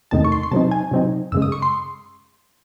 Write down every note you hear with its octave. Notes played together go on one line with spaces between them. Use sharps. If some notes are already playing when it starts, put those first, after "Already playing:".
E2 C3 D#3 A3 D#4 A5
C#6
C6
C6
C3 F#3 C4 D#4 A5
G#5
C3 F#3 C4 D#4
F#2 C#3 G#3 E6
D#6
C#6
C6